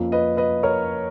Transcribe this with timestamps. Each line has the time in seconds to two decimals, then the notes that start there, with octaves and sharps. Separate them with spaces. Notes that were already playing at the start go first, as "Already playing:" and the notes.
Already playing: F2 F3 A#3 C#4 F4
0.12 B4 D#5
0.37 B4 D#5
0.63 A#4 C#5